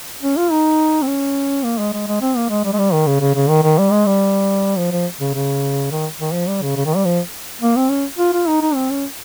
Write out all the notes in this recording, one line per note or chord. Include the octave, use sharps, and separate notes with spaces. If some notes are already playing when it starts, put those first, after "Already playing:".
C#4
F4
D#4
C4
C#4
A#3
G#3
G#3
G#3
C4
A#3
G#3
G3
G#3
G3
D#3
C#3
C#3
C#3
D#3
D#3
G3
G#3
G3
F3
F3
C#3
C#3
D#3
D#3
F3
G3
C#3
C#3
D#3
G3
F3
A#3
C4
C#4
F4
F4
D#4
D#4
C4
C#4